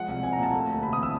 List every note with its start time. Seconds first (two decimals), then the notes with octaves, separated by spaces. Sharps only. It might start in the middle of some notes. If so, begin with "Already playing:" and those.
Already playing: F3 G#3 F#5
0.08 C2
0.23 C2 G#5
0.33 A#5
0.38 A#2 A5
0.52 A3
0.67 D2
0.83 C3 B5
0.93 E3 D#6
1.03 E6